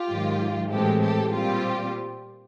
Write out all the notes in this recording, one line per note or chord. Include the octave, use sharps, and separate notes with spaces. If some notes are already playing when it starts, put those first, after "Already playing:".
Already playing: F4 G4
G#2 D#3 F#3
A2 E3 G#3 C4 G4 A4
G4 A4
A#2 G3 C4 F4 G4